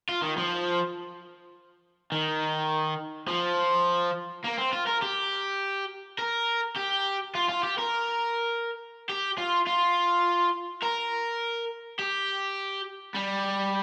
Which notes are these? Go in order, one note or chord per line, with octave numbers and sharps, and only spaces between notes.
F4
D#3
F3
D#3
F3
A#3
C4
F4
A#4
G4
A#4
G4
F4
F4
G4
A#4
G4
F4
F4
A#4
G4
G3